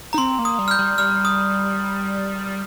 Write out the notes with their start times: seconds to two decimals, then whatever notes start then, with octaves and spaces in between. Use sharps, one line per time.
0.13 D#4 A#5
0.18 C4 C6
0.39 A#3
0.45 D#6
0.59 G3
0.68 F6
0.71 G6
0.79 G3
0.98 G3 F6
1.25 D#6